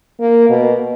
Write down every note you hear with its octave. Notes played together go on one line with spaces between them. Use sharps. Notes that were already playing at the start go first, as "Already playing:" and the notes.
A#3
B2